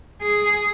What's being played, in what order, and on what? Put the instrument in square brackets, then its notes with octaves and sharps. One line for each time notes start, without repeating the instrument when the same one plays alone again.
[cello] G#4